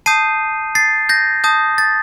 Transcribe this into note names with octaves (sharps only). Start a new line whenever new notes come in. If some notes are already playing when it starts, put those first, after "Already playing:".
A5 D#6 G6 C7 D#7
A6 C7
G6 A#6
A5 D#6 G6
A6